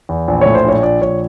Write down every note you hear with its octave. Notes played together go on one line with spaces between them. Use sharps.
E2
A#1
A2 C#5
C5
A#1 C#5
A#1 D5
A#1 C#5